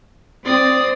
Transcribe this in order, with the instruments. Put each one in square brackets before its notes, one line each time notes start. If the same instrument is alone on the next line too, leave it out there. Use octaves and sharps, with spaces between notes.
[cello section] C4 [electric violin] D5 D#6